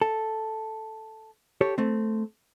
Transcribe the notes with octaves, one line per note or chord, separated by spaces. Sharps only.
A4
G4 A4 C#5
A3 C4